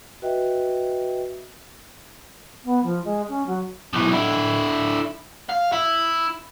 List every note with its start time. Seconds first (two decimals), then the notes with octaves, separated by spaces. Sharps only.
0.22 F#4 B4 D#5 E5 G5
2.65 B3
2.84 F3
3.04 G#3
3.29 C#4
3.47 F#3
3.93 B1 E3
4.12 D3 E4
5.50 F5
5.73 E4